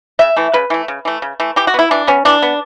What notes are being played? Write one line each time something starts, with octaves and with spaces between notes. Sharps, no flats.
C#3 E5
E3 A3
C#3 B4
E3 A3
C#3
E3 A3
C#3
E3 A3
E3 G4
F#4
B3 E4
E3 D4
B3 C#4
E3 D4
B3